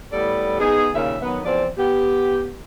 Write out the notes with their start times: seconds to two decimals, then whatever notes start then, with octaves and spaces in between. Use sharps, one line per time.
0.12 A2 G3 B3 A4 D5
0.60 B3 D#4 G#4
0.94 D#2 A#2 C#3 E5
1.22 D#3 F#3 B3
1.44 E2 F3 C4 D5
1.78 B3 G4